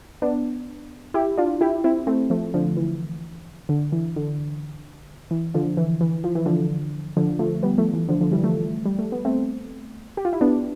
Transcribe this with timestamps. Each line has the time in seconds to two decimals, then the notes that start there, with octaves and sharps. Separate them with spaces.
0.22 B3 D4
1.14 E4 G4
1.37 D4 F4
1.61 E4 G4
1.84 C4 E4
2.07 A3 C4
2.30 F3 A3
2.54 D3 F3
2.77 E3
3.69 D3
3.92 E3
4.16 D3
5.31 E3
5.54 D3 F3
5.77 E3
6.01 E3
6.24 F3
6.35 E3
6.46 D3 F3
7.17 D3 F3
7.39 F3 A3
7.63 G3 B3
7.78 F3 A3
7.94 E3
8.09 D3 F3
8.21 D3 F3
8.32 E3 G3
8.44 F3 A3
8.85 G3
8.99 A3
9.12 B3
9.25 A3 C4
10.17 G4
10.25 F4
10.33 E4
10.41 B3 D4